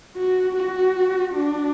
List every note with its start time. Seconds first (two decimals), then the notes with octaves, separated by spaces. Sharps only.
0.17 F#4
0.56 F#4
1.34 D4